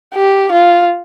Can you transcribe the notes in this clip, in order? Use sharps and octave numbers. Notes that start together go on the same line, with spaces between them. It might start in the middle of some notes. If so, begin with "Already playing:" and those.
G4
F4